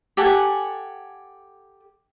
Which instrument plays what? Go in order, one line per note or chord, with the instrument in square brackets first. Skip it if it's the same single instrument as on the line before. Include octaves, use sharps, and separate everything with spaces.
[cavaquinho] G4 A4 F#5 G#5